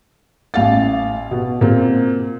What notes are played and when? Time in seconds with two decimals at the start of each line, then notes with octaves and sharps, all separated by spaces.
0.54 A1 F5 A6
1.31 B2
1.61 A#2 C4